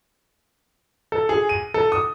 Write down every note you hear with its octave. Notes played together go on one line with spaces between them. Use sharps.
A4
G#4
D#7
A4
D#6